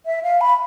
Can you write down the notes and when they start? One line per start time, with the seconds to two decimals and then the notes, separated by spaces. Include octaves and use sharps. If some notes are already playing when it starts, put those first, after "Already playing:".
0.06 E5
0.23 F5
0.41 B5